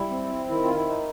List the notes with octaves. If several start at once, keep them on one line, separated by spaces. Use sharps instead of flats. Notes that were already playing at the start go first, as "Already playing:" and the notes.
Already playing: G3 E4
C4
D#3 E4
F4
E4
D#4